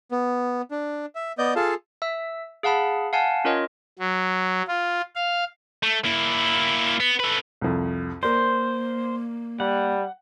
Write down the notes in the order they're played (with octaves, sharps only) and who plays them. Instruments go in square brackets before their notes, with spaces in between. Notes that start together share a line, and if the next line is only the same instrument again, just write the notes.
[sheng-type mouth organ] B3
D4
E5
B3 D5 D#5 G6
F4 G#4 A4 F5 A5
[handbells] E5 E6
G#4 F5 F#5 A5 B5
F5 F#5 G#5 A5
C#4 F4 A#4 C#5 D#5
[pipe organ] F#3
F4
F5
[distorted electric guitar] A3
A#3 E4
B3
A3 B4
[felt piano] C2 F2
[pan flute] A#3 [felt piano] A#4 D5 [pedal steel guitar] C5
[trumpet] G3 [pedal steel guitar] F#5